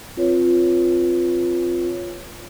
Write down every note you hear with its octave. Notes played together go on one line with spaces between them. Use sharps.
C4 F4 B4 C#5